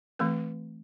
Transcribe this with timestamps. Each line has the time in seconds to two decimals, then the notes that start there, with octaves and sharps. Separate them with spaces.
0.19 E3 A3 C4 B4